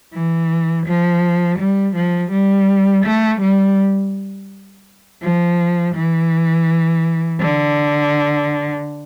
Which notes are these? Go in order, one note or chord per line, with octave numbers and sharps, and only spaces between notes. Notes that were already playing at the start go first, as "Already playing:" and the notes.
E3
F3
G3
F3
G3
A3
G3
F3
E3
D3